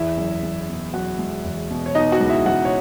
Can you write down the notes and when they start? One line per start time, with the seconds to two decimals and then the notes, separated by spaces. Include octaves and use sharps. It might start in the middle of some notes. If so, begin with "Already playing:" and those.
Already playing: E2 E4 E5
0.17 F#1
0.43 F#1
0.69 B2
0.93 F#1 F#4 F#5
1.19 G#3
1.44 E2
1.70 B2
1.86 C#5
1.95 B2 D#4 D#5
2.12 F#4 F#5
2.21 C#2
2.29 E4 E5
2.46 C#2 F#4 F#5
2.65 C#5